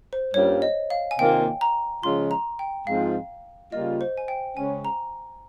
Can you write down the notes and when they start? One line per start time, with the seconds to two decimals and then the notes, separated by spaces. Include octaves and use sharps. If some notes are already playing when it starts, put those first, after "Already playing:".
0.13 C5
0.34 G2 G3 A#3 C#4 F4 C#5
0.62 D#5
0.90 F5
1.11 G#5
1.18 C3 D#3 A#3 F4 G5
1.61 A#5
2.02 C#3 F3 G#3 C#4 F4 C6
2.31 A#5
2.59 G5
2.87 G#2 F3 G#3 C4 F4 F5
3.72 C#3 G3 A#3 F4 D#5
4.01 C5
4.17 G#5
4.28 G5
4.57 C#3 G#3 C#4 G#5
4.85 A#5